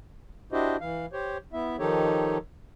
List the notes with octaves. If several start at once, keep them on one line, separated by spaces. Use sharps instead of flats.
D4 E4 F#4 G4 C5 D#5
E3 F5
G4 C5 C#5
B3 E4 E5
D#3 F3 D#4 G4 A4 C#5